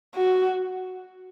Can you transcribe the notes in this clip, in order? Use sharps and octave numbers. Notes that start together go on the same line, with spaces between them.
F#4